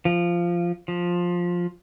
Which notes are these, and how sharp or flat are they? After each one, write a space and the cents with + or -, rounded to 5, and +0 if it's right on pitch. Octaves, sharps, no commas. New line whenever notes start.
F3 -10
F3 +10